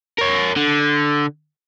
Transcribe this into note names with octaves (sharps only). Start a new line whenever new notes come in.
A#4 C#5
D3